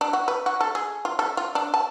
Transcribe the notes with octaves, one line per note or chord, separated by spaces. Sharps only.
D4
F#4
B4
F#4
A4
G#4
F4
A4
F4
D4
A5